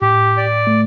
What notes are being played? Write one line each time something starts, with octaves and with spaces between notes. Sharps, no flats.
A2 G4
D5
A3